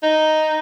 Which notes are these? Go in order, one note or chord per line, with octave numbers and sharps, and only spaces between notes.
D#4